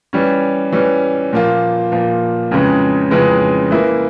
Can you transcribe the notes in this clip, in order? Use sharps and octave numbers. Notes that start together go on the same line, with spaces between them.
E3 G3 C#4
E3 G3 C#4
A#2 F3 A#3 F4
A#2 F3 A#3 F4
F2 C#3 E3 G#3 C#4
F2 C#3 E3 G#3 C#4
E3 A#3 E4